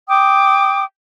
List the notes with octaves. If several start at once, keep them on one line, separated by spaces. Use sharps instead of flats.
G5 D6 D#6